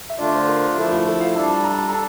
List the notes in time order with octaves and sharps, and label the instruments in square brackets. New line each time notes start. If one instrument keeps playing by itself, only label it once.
[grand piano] E5
[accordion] D3 A3 D4 F4 [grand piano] D5
[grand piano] C5
A#4
[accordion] F3 A3 E4 [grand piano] A4
[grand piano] F4
A4
F5
[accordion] G3 D4 A4 [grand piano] A5
[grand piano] A5
A#5
A5
A#5
[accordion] A4 [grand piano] A5